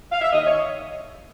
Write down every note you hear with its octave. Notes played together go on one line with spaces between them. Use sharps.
F5
E5
D#2 D#5
C#5